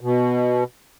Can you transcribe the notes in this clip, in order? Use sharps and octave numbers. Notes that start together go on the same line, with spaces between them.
B2